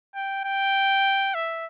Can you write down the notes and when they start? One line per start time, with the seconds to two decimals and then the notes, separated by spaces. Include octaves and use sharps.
0.15 G5
0.45 G5
1.35 E5